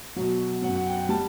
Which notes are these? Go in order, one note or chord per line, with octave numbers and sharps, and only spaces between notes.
B2 F#3
F#3 F#5
F#2
F#5
G5
F#5
G5
G3 A5